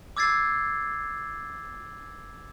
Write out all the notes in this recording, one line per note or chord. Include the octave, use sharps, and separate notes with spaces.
D6 E6 G#6 A6 C7